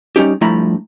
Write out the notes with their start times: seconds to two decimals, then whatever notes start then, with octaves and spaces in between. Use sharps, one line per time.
0.16 G3 C#4 D#4 G4
0.41 G2 F3 A3 E4 A#5 B5